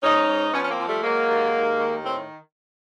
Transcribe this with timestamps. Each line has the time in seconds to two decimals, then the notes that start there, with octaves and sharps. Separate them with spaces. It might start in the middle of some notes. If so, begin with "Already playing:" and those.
0.03 G#2 C#4 D#4
0.28 G#2
0.53 F3 B3 C#4
0.63 C#4
0.70 A#3 C4
0.78 F3
0.87 G3 A3
1.03 F#3 G#3 A#3
1.29 D#2
1.54 D#2
1.79 D#3
2.03 A2 C4